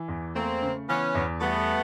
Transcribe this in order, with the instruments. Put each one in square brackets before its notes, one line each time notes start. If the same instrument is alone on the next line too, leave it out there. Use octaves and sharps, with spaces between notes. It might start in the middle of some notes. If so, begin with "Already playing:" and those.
Already playing: [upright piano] E3
E2
[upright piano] A3 [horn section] A#3 C4
[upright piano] C#3
[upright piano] E3 [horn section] B3 C#4
[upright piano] E2
[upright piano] G3 [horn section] A3 B3